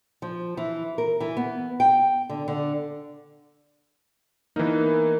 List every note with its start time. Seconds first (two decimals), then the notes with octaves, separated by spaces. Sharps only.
0.22 F3
0.57 E3
0.98 A#4
1.20 E3
1.37 B3
1.80 G5
2.30 D3
2.48 D3
4.56 E3 A#3 B3 D#4